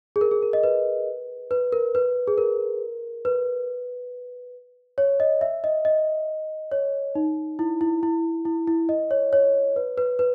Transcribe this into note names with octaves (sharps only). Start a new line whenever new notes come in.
G#4
A#4
G#4
A#4
D#5
B4
B4
A#4
B4
G#4
A#4
B4
C#5
D#5
E5
D#5
D#5
C#5
D#4
E4
E4
E4
E4
E4
D#5
C#5
C#5
B4
B4
B4